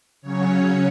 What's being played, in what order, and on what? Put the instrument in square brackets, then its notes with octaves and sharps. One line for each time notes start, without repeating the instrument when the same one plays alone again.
[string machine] C#3 F#3 C#4 C#5